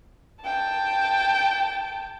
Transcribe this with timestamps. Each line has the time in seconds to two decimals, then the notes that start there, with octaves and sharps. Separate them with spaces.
0.43 G5 A5